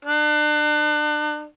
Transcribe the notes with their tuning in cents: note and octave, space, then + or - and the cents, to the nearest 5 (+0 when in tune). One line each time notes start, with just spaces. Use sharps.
D4 +35